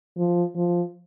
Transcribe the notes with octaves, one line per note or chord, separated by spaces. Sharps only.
F3
F3